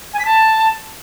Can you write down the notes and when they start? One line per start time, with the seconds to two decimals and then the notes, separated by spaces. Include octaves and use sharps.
0.14 G#5
0.19 B6
0.25 A5